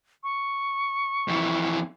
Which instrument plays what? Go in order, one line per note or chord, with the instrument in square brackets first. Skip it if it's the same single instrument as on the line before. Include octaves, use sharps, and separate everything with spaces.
[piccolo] C#6
[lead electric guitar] F2 E3